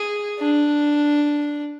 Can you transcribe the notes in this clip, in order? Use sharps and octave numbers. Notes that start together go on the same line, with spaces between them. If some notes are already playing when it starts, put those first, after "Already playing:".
Already playing: G#4
D4